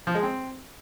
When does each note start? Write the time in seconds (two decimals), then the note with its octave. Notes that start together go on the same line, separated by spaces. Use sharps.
0.07 F3
0.15 G#3
0.23 C4